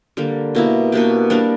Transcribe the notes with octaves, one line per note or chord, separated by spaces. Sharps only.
D3 G3 A#3
B2 A#3 E4
B2 A#3 D4 G4
G3 A#3 D4 A#4